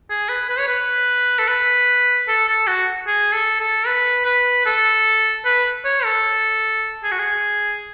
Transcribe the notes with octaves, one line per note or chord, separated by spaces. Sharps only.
G#4
B4
B4
C#5
B4
A4
B4
A4
A4
F#4
G#4
A4
A4
B4
B4
A4
B4
C#5
A4
G#4
F#4
G#4